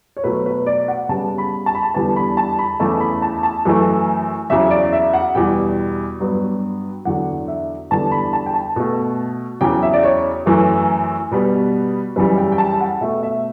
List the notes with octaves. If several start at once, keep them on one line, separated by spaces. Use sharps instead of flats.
C#5
B2 F#3 A3 B4
B4
D5
F#5
C#3 G3 B3 A5
B5
A5
B5
A5
E2 D3 G3 B3 A5
B5
A5
B5
E2 C#3 E3 A3 A5
B5
A5
A5
F#2 E3 A3
E2 C#3 F#3 E5
D5
E5
F#5
E2 B2 G3 G5
G2 F#3 B3
E2 D3 F#3 F#5
E5
E2 D3 G3 B3 A5
B5
A5
G5
A5
B2 A3
E2 C#3 F#3 G5
E5
D5
C#5
F#2 E3 A3
B2 G3 B3
F#2 C#3 E3 G3 B4
G5
G5
A5
F#5
B2 A3 E5
E5